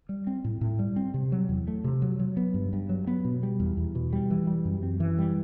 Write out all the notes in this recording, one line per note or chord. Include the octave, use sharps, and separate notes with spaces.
G3
C4
A2
A2
G3
C4
C3
F#3
E2
A3
C3
F#3
F#3
B3
G2
G2
F#3
B3
B2
G3
E2
E2
B2
G3
E3
G3
F#2
C4
E3
G3